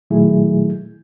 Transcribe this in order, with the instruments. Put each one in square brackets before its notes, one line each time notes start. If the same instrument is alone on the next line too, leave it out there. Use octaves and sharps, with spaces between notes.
[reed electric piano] A#2 D#3 F#3 A3 E4 G#4